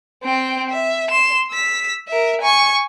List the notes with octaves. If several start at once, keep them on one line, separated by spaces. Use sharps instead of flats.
C4 G5
E5
C6 E7
E6 B6
A#4 E5
G#5 C#6